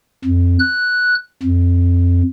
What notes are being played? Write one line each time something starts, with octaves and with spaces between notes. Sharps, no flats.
F2
F#6
F2